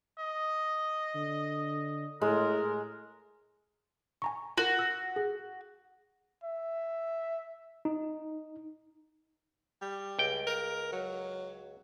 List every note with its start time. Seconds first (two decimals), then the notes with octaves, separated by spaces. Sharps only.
0.19 D#5
1.15 D3
2.21 A2 G#3 A#4
4.22 G#5 A#5 C#6
4.58 F4 F#4 A#4
4.79 E6
5.16 G#4
6.44 E5
7.85 D#4
9.82 G3
10.19 C#2 G5
10.47 A#4
10.92 F#3